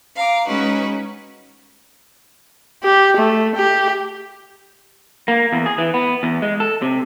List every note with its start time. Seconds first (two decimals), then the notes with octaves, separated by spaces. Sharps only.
0.16 F5 A#5 D6
0.47 G#3 C#4 D#4 F#4 B4
2.84 G4
3.17 A3
3.56 G4
5.28 A#3
5.53 E2
5.66 G#4
5.78 E3
5.94 B3
6.23 E2
6.42 G#3
6.60 A4
6.82 C3